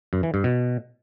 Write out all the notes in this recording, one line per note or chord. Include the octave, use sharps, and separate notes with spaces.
F#2
E3
G2
B2